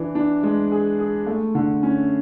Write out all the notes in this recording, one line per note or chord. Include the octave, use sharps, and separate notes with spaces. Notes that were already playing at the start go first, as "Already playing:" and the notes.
Already playing: E3 D4
D4
G#3
G#4
G#4
A3
D3
C#4